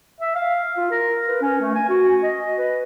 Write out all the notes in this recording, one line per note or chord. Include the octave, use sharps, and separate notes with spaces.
E5
F5
F4
A#4
B4
C#4
A3
G#5
F#4
D#5
B4